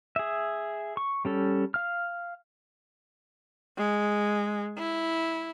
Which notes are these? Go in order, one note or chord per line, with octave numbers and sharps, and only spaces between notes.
G#4 E5
C#6
G3 C#4 A4
F5 F6
G#3
E4